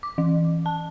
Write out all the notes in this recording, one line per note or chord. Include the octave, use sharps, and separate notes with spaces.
D6
E3
A5